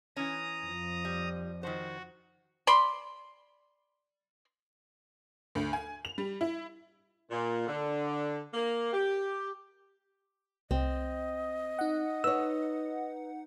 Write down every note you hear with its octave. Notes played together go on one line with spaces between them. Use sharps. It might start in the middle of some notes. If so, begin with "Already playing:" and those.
E3 C#4 A#5 D#6
F2 F3
G3
D#3 F#4 C5
D5 B5 C6
D2
G#5
F7
G3
E4
A#2
D3
A#3
G4
C2 C4 D#5
D#4 F#5
B4 C#5 E6